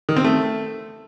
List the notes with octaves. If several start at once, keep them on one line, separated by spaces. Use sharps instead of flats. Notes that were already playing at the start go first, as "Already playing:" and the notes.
D#3
C4
A3